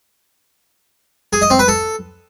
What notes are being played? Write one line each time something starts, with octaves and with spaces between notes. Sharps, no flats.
G#4
D#5
C4
B4
A4